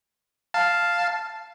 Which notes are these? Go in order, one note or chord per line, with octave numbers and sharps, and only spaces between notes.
F5 A5